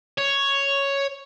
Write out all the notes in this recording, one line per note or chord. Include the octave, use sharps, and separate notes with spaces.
C#5